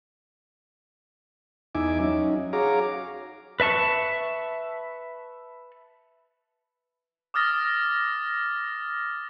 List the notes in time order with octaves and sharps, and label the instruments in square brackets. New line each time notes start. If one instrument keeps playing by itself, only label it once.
[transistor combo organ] E2 D#4 E5 G#5 D6
F#3 C#4 D#4
F#4 G#4 C#5 F5 A#5 D6
[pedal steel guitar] B4 E5 A5 C#6
[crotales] D6 D#6 F6 A6 A#6